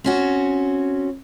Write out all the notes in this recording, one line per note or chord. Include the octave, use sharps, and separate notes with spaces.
C4 C#4 F#4